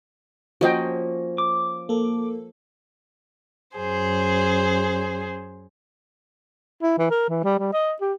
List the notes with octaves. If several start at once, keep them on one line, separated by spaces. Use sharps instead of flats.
F3 A#3 C#4 F#4 D#5 G5
D6
A#3 A4
F#2 G#4 C5
E4
E3
A#4
E3
G3
G3
D#5
G4